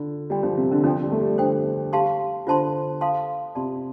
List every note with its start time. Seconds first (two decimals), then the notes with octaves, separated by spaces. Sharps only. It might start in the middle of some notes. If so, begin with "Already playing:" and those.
Already playing: D3 F4
0.30 G3 F4 D5 G5 C6
0.43 F3
0.57 C3
0.71 D3
0.84 F3 A4 D5 G5 C6
1.03 G3
1.12 A3
1.20 G3
1.38 D3 A4 C5 G5
1.93 G4 F5 A5 C6
2.47 D3 F4 C5 A5 C6
3.01 A4 F5 A5 C6
3.55 C3 F4 D5 A5 C6